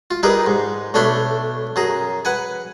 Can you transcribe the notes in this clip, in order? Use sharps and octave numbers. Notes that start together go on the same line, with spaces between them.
F4
G3 D#4 G#4 A#4 B4
G#2
B1 A3 D4 C#5 B5 C6
F#2 G#4 A#5
B4 F#5 G#5